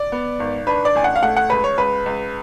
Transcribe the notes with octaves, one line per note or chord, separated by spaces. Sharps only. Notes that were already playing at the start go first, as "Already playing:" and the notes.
Already playing: D5
B3
G#1
D4 B4
D5
A1 G#5
F#5
F5
A3 F#5
F#5
C#2 B4
C#5
C#2 B4
C#2